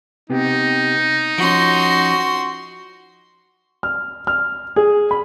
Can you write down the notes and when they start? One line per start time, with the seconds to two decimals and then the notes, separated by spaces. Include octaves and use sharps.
0.30 C3 B3 D#4 G4
1.38 F3 C#4 F#4 C6
3.83 F6
4.27 F6
4.76 G#4
5.11 B5